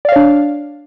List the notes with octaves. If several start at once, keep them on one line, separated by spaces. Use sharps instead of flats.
D4 C#5 D5 F5